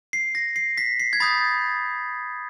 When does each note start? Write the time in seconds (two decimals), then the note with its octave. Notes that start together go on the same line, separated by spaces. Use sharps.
0.13 C7
0.35 A#6
0.56 C7
0.78 B6
1.00 C7
1.13 G#6
1.20 B5 D#6 G6 A6